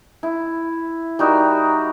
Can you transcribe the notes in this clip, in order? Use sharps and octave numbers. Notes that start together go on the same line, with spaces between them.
E4
G3 D#4 F#4 A#4